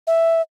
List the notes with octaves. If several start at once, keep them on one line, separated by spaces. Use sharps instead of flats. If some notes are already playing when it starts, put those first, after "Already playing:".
E5